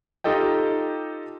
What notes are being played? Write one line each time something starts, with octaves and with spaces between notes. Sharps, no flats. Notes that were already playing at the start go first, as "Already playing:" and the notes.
D#4 F4 G4 A4 D#5 G5